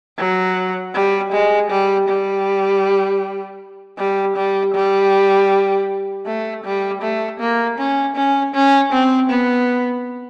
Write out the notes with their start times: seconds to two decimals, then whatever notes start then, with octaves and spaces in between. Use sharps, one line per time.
0.18 F#3
0.94 G3
1.32 G#3
1.70 G3
2.08 G3
3.98 G3
4.36 G3
4.74 G3
6.26 A3
6.64 G3
7.02 A3
7.40 A#3
7.78 C#4
8.16 C#4
8.54 C#4
8.92 C4
9.30 B3